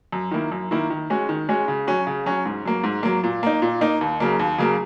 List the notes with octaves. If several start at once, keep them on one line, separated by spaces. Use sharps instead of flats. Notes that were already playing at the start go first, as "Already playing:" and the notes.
F#2
D#3 A#3 E4
F#2
D#3 A#3 E4
D#3
G#3 C#4 F#4
D#3
G#3 C#4 F#4
C#3
F#3 C#4 F#4
C#3
F#3 C#4 F#4
G#2
F#3 A#3
G#2
F#3 A#3
A#2
A#3 D#4
A#2
A#3 D#4
D#2
C#3 F#3 A#3
D#2
C#3 F#3 A#3